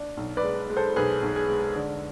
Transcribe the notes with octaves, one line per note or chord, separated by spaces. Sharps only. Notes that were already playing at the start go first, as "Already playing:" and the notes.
Already playing: D4
B1
B4 D5
G#3
G#3
A4 C5
B1 G#4 B4
B1
G#4
G#3
D3